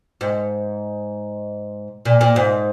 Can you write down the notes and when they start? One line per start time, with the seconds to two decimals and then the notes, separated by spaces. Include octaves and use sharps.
0.21 G#2
2.05 A#2
2.21 A#2
2.36 G#2